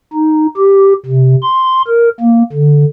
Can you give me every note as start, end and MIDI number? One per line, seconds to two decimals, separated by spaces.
0.13 0.46 63
0.56 0.93 67
1.06 1.36 48
1.42 1.82 84
1.87 2.09 70
2.20 2.43 58
2.52 2.84 50